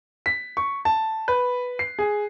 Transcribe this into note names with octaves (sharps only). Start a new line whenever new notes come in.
B6
C#6
A5
B4
C7
G#4